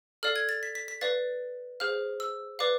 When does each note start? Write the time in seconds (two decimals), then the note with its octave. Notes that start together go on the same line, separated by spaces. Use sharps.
0.23 A4 D5 F5 F6
0.36 G#6
0.49 A6
0.63 B6
0.75 B6
0.88 B6
1.01 B4 D5 F5 A6
1.80 G#4 C5 F5 F6
2.20 E6
2.59 B4 D5 F5 D6